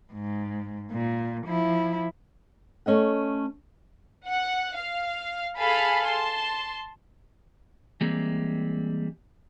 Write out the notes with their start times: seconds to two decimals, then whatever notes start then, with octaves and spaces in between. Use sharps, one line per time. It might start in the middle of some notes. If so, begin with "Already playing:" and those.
0.13 G#2
0.92 A#2
1.46 F3 E4
2.86 A3 C#4 D#5 F#5
4.27 F#5
4.77 F5
5.58 G#4 A4 F5 G#5 A5 B5
6.06 A5 C6
8.01 E3 G3 G#3 A#3 C4